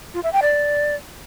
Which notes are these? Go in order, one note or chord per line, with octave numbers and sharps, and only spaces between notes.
F4
E5
G5
D5